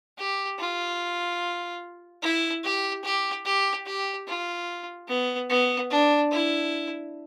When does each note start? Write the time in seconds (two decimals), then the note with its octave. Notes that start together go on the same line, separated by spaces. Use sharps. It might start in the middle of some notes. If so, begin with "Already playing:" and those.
0.18 G4
0.59 F4
2.22 E4
2.64 G4
3.04 G4
3.45 G4
3.86 G4
4.27 F4
5.09 B3
5.50 B3
5.91 D4
6.32 E4